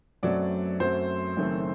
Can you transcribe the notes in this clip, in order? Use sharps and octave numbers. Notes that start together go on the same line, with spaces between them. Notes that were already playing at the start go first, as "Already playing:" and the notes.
F#2 F#3 A3 C4 D5
F#2 F#3 A3 C4 C5
F#1 F#2 D#3 A3 C4